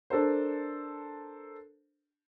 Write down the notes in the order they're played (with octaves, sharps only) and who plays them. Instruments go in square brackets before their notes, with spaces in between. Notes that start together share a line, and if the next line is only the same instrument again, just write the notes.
[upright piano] D4 A4 A#4 C5